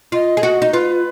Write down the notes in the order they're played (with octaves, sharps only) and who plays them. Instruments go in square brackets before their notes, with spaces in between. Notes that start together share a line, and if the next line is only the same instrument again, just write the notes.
[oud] F4 [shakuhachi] D#5
[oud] G#4
F#4
D#4
[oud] F4 [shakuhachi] B4